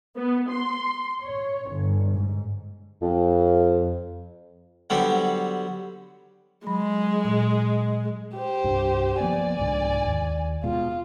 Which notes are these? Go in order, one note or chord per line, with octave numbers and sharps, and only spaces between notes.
B3
C6
C#5
G1
G#2
F2
D3 F#3 G3 B3 C4
F#3 G#3 B5
A#2
G4 C5
C2 G2
F3 A#3 B3 D5 G#5
C2 G#2 D3
D#2
B2 G#3 F4